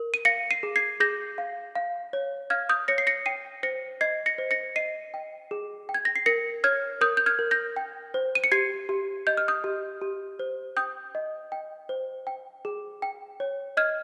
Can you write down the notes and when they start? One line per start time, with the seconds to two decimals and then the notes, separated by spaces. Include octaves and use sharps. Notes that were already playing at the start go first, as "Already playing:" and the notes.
Already playing: A#4
0.14 D#7
0.25 F5 A#6 C#7
0.51 C7 D#7
0.63 G#4
0.76 G#6 C7
1.00 G#4 G6 A#6
1.38 F5
1.75 F5
2.13 C#5
2.50 F5 F6 G#6
2.69 D#6 G6
2.88 C#5 A#6 C#7
2.98 C7
3.07 A#6 C#7
3.26 G5 C7 D#7
3.63 C5 A#6 C#7
4.01 D#5 G#6 C7
4.26 A#6 C#7
4.38 C5
4.51 A#6 C#7
4.76 D#5 C7 D#7
5.14 G5
5.51 G#4
5.89 G5
5.94 G#6
6.05 A#6
6.16 C7
6.26 A#4 A#6 C#7
6.64 C#5 F6 G#6
7.01 A#4 D#6 G6
7.17 G6
7.26 F6 G#6
7.39 A#4
7.51 G6 A#6
7.76 G5
8.14 C5
8.35 D#7
8.44 C#7
8.52 G4 G#6 C7
8.89 G4
9.27 D#5 G6
9.37 F6
9.48 D#6 G6
9.64 G4
10.01 G4
10.39 C5
10.77 G5 D#6 G6
11.15 D#5
11.52 G5
11.89 C5
12.27 G5
12.65 G#4
13.02 G5
13.40 C#5
13.77 D#5 F6 G#6